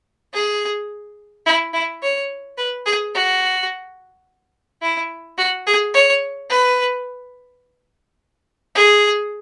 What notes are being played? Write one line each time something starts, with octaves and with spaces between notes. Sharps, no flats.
G#4
E4
E4
C#5
B4
G#4
F#4
E4
F#4
G#4
C#5
B4
G#4